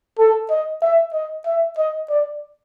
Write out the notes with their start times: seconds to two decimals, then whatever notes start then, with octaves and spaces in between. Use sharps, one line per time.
0.19 A4
0.50 D#5
0.82 E5
1.14 D#5
1.46 E5
1.78 D#5
2.10 D5